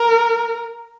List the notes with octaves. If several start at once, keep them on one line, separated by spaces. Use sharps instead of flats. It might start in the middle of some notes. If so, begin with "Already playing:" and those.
Already playing: A#4